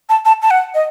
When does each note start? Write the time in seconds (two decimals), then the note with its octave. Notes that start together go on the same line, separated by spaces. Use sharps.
0.09 A5
0.25 A5
0.42 A5
0.51 F#5
0.75 D#5